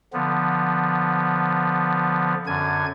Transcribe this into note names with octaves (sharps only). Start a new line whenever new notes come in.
D3 F3 B3
F#2 D3 G#5 G#6